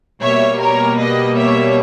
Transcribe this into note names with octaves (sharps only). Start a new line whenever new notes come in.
B2 G3 A#3 C#5 E5
A#4 C#5
B4 D#5
C#5 E5